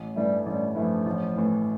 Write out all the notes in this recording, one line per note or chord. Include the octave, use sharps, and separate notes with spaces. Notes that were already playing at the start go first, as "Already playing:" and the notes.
Already playing: A1
G2 E3 G3 A3 E4
A1 G3
G2 E3 F3 A3 E4
A1
A2 E3